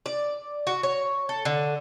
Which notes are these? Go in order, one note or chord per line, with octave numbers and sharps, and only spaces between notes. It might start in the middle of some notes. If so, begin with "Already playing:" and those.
D5
F#4
C#5
A4
D3